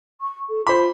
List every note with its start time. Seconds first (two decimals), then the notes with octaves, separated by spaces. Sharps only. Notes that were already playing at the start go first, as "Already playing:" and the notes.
0.21 C#6
0.49 A4
0.67 F4 C5 B5